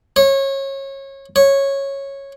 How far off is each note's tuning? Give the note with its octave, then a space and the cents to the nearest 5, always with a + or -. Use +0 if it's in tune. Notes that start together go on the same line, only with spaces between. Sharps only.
C#5 -25
C#5 -10